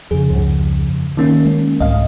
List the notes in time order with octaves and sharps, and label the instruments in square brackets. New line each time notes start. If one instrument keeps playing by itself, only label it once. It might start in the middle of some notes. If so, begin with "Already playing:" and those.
[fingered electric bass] F2 C#3 [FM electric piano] G#4
[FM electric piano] C#2 G2
D#3 A#3 C#4
[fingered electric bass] G#3
[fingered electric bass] C2 G#2 [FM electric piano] D#5 F5